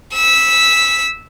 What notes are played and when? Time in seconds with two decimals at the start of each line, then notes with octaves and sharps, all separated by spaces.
0.14 E6 B6